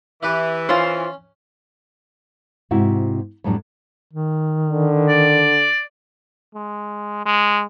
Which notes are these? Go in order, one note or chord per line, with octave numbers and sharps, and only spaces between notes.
E3 E4 G4 B4
C#4 F4 C5
G#2 C3 E4 F#4
F2 A2 F#3 G3 D4
D#3
D3
D5
G#3
G#3